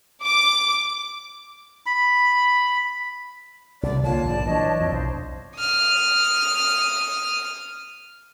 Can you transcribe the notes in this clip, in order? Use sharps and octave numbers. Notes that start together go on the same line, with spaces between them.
D6
B5
C2 D5
D3 A#3 F4 C#5 A5
A#1 G#2 D5
E3 F#3 D4 C#5 D#5
F2
B1 C5
D#6 F6